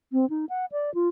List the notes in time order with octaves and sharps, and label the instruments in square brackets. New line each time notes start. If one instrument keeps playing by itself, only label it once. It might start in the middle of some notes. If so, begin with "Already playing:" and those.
[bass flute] C4
D#4
F#5
D5
F4